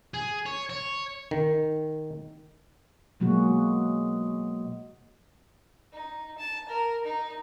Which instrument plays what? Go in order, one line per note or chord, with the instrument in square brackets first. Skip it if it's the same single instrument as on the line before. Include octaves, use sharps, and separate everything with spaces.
[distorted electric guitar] G#4
C#5
C#5
[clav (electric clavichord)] D#3
[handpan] B2 F#3 G#3 A#3 F#4
[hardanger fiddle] D#4
A5
A#4
D#4